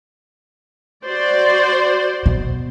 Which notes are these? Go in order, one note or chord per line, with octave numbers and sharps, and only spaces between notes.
F#4 C5 D5
B2